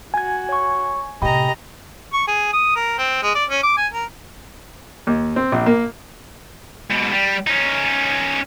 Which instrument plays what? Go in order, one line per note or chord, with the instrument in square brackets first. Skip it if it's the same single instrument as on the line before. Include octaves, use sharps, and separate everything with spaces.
[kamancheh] F#4 [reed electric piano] G#5 G#6
[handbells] C#5 C#6
[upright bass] A2 C3 [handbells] G4 G5 B5 [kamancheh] D#5 A#5
[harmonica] C#6
G#4
D#6
A#4
C4
G#3
D5
C#4
D6
G#5
A#4
[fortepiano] D#2
C4
A#1
A#3
[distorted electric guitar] G#2 B2
G3
C#4 D#4